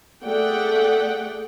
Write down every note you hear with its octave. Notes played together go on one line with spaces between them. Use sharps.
A3 G#4 D5 F#5 G5